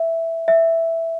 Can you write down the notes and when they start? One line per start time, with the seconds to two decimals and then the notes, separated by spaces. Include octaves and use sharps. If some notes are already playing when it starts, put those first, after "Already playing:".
Already playing: E5
0.48 E5